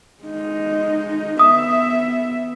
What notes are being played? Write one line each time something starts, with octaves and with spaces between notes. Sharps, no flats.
G#3 D#4
B3 E5 D#6